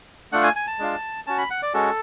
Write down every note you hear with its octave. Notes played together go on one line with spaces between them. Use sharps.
A3 D4 F4 F#5
G#5
G#5
A5
G#3 D4 F4
C#4 F#4 A5
B5
F#5
D5
G#3 C#4 F#4 A4